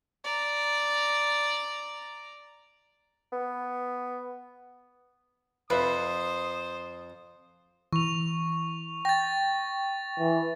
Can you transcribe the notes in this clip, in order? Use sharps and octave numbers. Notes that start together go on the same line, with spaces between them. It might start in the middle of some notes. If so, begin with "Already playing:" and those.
D5 A#5
B3
F2 B4 C5 E5 D#6
E3 C#6 F7
G5 A6 A#6
E3